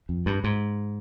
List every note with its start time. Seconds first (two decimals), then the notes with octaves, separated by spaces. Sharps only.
0.09 F2
0.26 G2
0.44 G#2